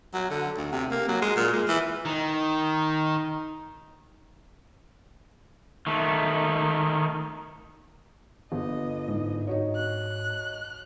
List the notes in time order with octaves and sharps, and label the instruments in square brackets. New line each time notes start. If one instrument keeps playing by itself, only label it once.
[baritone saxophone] F#3
D3
D2
C3
A#3
F#3
G#3
A#2
G#3
E3
[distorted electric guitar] D#3 [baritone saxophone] D#4
[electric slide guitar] D#3 A3
[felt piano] G1 [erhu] D#5
[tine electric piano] G#2
[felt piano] D#4 F#4 C#5
[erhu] F#6